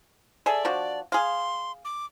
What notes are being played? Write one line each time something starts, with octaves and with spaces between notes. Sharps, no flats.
G#4 A4 D5 E5
F3 D4 F#4
G#4 F5 C6
D6